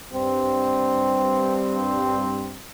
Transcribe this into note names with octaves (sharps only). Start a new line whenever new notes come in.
G2 C4